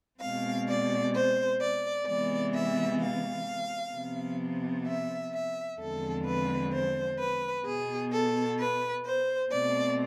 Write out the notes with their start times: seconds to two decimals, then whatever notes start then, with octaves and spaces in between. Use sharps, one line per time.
0.20 B2 G#3 C4 F5
0.68 D5
1.14 C5
1.61 D5
2.06 C3 E3 G#3 B3 D5
2.54 E5
3.00 F5
3.94 C3 F3 B3
4.87 E5
5.33 E5
5.79 E2 D3 F3 G#3 C4 A4
6.26 B4
6.73 C5
7.20 B4
7.65 B2 B3 G#4
8.12 A4
8.59 B4
9.05 C5
9.51 B2 A3 C4 D5